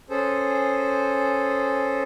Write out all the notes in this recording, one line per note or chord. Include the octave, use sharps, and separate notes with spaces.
C#4 G#4 A4 C5